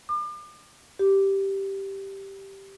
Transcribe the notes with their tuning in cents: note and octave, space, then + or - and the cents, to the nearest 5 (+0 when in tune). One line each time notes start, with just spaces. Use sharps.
D6 +40
G4 -5